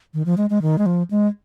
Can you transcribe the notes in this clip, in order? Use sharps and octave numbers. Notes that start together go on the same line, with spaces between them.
D#3
F3
G#3
G#3
D#3
G#3
F3
G#3